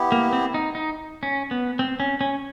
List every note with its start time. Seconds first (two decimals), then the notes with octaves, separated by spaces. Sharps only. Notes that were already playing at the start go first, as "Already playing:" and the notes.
Already playing: B3 E4 G4
0.12 A#3
0.33 C4
0.54 D#4
0.75 D#4
1.23 C#4
1.51 B3
1.79 C4
2.00 C#4
2.21 C#4